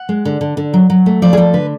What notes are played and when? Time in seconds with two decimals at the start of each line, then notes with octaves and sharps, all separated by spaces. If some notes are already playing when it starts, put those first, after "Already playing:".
Already playing: F#5
0.09 G#3
0.25 D3
0.41 D3
0.57 D3
0.74 F#3
0.90 F#3
1.06 A3
1.22 F3 D5
1.33 G#4
1.37 F3 A4
1.54 D3 B4